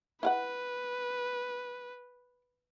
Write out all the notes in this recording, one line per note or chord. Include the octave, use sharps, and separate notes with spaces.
E4 B4 F5 F#5